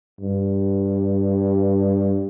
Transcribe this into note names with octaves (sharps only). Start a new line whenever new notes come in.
G2